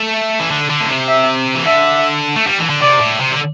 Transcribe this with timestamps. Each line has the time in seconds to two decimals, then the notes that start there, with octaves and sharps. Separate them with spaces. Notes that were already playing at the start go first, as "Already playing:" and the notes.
Already playing: A3
0.40 E3
0.51 D3
0.70 D3
0.81 A2
0.89 C3
1.08 E5
1.56 E3
1.66 D3 E5
2.36 A3
2.47 G3
2.58 E3
2.70 D3
2.81 C3 D5
3.01 A2
3.20 C3
3.31 D3